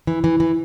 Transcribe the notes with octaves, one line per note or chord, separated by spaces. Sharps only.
E3
E3
E3